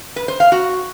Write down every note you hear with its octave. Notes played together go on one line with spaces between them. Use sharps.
B4
C5
F5
F#4